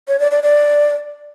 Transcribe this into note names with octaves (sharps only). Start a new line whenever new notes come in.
C#5
D5
D5
D5